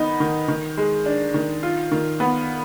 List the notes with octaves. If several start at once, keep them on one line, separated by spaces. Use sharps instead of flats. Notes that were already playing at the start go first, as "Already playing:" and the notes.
Already playing: D#3 B3 D#4
D#3
D#3
G#3
D4
D#3
F4
D#3
B3